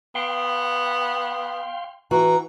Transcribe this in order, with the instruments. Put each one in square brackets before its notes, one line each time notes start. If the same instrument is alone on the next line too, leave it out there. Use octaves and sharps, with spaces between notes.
[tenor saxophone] B3 [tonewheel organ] F5 G5 C6
[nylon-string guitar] E3 F#4 [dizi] A#5